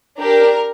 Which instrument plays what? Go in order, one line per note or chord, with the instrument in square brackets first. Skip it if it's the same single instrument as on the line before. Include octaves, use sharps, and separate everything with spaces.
[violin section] D4 G4 A#4